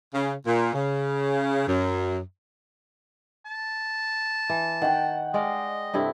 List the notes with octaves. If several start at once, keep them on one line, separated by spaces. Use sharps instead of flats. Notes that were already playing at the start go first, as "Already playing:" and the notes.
C#3
A#2
C#3
F#2
A5
E3
D#3 F#5 G5
G#3 D5 D#5 F5
G2 C3 E4 A4